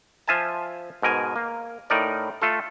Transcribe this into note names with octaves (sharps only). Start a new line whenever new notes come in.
F3 F4 E5 G#5 A5
G#2 B2 A#4 G#5
A#3
A2 D#4 A#4 D5
A3 F4 A4